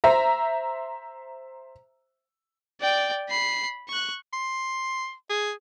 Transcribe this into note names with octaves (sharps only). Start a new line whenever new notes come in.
C5 E5 A#5
D5 G5
B5 C7
C#6 F#6
C6
G#4